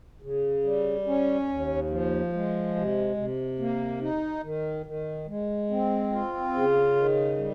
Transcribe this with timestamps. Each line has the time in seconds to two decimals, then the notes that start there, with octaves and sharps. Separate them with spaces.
0.22 C#3
0.64 G3
1.07 C#4
1.49 D#2
1.90 F3
2.33 G#3
2.75 C3
3.17 C3
3.59 A#3
4.01 D#4
4.43 D#3
4.86 D#3
5.27 G#3
5.70 C4
6.12 F4
6.54 C#3
6.96 D#3
7.38 G3